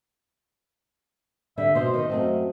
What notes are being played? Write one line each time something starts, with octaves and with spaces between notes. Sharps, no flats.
D3 G3 E5
B2 C5
D#3 D#5
F#2 A3 C4